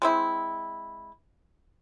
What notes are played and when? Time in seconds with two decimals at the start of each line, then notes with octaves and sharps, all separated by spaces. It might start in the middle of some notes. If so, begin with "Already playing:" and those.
0.02 G#3 C4 E4